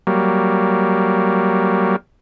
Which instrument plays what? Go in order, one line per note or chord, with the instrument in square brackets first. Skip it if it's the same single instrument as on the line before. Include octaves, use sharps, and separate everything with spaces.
[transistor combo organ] F#3 G3 A#3